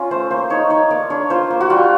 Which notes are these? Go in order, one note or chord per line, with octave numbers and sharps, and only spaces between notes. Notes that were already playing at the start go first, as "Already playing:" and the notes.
Already playing: C#4 F4
A3 C5
A#3 C5
D#4 C#5
D#4 C#5
A#3 D5
D4 C#5
F4 C5
A#3
F#4
G3 F4